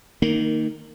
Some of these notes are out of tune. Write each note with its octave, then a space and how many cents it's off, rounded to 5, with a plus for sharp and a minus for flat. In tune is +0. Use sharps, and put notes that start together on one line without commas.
D#3 +0 A#3 -15